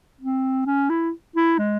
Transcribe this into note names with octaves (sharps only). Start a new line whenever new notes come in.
C4
C#4
E4
E4
G#3